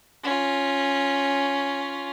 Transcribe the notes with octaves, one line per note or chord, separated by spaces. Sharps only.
C#4 F4